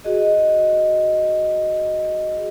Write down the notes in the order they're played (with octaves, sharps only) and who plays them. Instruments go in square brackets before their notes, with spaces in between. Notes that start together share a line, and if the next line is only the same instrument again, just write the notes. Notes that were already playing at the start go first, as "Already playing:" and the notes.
[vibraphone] F#4 G#4 D#5